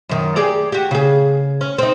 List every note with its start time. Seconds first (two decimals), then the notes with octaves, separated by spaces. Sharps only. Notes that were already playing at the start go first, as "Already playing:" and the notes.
0.09 F#2 D#3
0.36 G4 G#4 D5
0.72 F#4 G4
0.91 C#3 G#4
1.61 C#4
1.78 C4 D#4